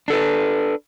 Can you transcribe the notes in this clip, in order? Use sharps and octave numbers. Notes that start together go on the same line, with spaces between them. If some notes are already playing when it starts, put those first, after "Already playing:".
D4 A4 B4